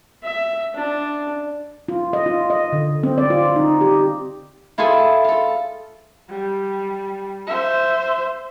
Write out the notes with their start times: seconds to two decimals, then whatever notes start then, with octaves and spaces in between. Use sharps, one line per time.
0.23 E5
0.74 D4
1.88 F4
2.13 D#5
2.26 F4
2.50 D#5
2.72 D3
3.03 C4
3.18 D5
3.30 F4
3.56 D#4
3.81 G4
4.78 E4 F4 G#4 A4 G#5
5.24 F4 A4
6.29 G3
7.47 C5 E5